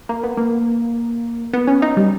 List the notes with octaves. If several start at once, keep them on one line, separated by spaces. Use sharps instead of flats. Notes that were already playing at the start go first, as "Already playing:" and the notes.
A#3
B3
A#3
B3
C#4
D#4
G3